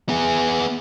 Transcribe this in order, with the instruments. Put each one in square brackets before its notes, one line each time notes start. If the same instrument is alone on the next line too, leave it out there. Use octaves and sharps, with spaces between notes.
[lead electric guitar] B3 G#4